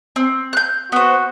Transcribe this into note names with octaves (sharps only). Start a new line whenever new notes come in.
C4
F#6 G6
B3 F#4 C5